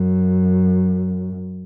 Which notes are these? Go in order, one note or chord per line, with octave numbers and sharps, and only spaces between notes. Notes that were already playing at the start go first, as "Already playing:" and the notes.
Already playing: F#2